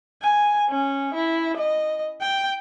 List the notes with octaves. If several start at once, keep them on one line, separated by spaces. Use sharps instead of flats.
G#5
C#4
E4
D#5
G5